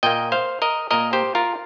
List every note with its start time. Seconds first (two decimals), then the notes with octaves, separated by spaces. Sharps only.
0.03 A#2 A#3 D#5 G5
0.32 C5 F5
0.62 A#4 D#5
0.91 A#2 A#3 A#4 D#5
1.13 G4 C5
1.35 F4 A#4